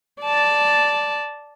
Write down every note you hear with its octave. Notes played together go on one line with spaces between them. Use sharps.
D5 A5